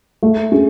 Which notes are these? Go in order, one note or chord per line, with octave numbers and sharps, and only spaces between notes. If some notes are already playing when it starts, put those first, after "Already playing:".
A3
C#4 G#4